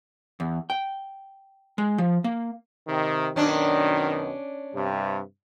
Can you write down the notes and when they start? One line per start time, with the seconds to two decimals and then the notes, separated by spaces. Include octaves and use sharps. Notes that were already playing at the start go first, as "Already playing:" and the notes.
0.40 E2
0.70 G5
1.78 G#3
1.98 F3
2.24 A#3
2.88 C3 D#3
3.36 F#2 B2 D#3 C#4 D4
4.75 G2 C3